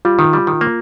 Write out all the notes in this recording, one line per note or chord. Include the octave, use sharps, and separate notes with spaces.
G3 F4
D#3
G3
D#3
A#3